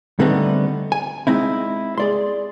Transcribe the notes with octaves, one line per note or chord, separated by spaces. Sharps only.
D3 G3 A3 B3 C4 D#4
G#5
G#3 C4 D#4 E4
G#4 D5 C6